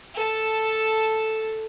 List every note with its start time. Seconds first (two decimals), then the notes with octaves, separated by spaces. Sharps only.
0.15 A4 A5